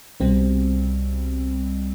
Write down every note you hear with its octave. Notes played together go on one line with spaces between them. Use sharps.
C2 B2 G3 C4